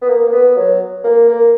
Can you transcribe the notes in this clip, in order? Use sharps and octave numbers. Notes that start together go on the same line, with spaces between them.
B3
A#3
A#3
B3
F#3
A#3
A#3